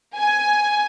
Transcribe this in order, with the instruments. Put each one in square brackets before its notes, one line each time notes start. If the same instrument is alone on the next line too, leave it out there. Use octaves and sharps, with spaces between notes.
[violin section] G#5